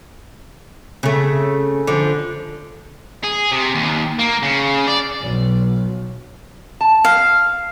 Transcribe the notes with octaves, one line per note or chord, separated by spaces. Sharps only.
C#3 A3
D3 F3
G#4
C3
D#2
A#3
C#3
D5
B1
A5
F5